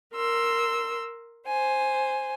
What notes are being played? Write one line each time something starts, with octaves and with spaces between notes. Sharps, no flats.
A#4 C6 E6
C5 G#5